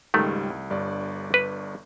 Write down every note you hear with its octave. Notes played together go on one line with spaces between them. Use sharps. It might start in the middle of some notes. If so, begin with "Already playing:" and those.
C#2 G#2 D#3 G3 A3
C2
G1 G2 D5
B4